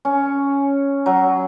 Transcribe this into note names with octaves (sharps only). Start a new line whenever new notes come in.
C#4
F#3